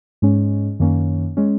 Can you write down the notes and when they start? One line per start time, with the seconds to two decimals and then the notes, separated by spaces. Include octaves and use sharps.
0.22 G#2 G#3 C#4
0.80 F#2 D#3 A#3 C#4
1.37 G#3 C#4